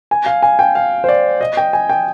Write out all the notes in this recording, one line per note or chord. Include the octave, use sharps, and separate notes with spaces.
G#5
F5
G#5
G5
F5
C5
D5
D#5
G5
G#5
G5